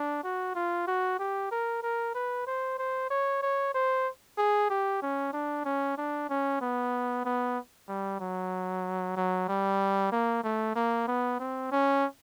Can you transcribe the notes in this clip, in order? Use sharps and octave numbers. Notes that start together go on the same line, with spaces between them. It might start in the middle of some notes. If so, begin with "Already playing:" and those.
Already playing: D4
F#4
F4
F#4
G4
A#4
A#4
B4
C5
C5
C#5
C#5
C5
G#4
G4
C#4
D4
C#4
D4
C#4
B3
B3
G3
F#3
F#3
G3
A#3
A3
A#3
B3
C4
C#4